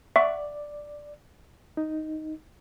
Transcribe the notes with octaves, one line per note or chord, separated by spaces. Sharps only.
D5 E5 F#5 C#6
D#4